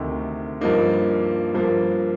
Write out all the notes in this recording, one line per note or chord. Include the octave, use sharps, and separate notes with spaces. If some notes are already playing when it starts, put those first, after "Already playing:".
Already playing: D2 C3 D#3
G2 F3 A#3 D#4
G2 F3 A#3